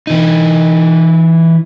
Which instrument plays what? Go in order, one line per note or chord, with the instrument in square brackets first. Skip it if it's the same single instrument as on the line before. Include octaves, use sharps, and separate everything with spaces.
[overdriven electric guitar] E3 D#4